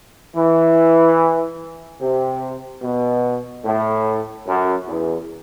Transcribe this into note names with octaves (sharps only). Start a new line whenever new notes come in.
E3
C3
B2
A2
F#2
E2